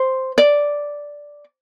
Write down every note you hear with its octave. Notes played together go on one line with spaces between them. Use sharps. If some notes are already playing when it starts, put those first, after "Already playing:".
Already playing: C5
D5